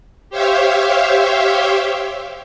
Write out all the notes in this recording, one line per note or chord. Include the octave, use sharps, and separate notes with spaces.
G4 C5 C#5 E5 F5 G5